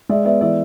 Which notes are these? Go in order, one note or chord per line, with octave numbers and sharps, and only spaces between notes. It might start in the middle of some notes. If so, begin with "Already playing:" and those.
G#3 D5 E5
B3 D5 E5
E3 D5 E5